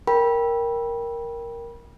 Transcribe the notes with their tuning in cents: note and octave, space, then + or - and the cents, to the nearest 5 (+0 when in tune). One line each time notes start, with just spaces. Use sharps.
A#4 +5 G5 +5 B5 -25